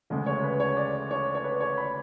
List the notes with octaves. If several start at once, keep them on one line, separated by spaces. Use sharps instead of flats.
D2 C#3 G#3
C#5
B4
C#5
D5
C#5
C#5
B4
C#5
B5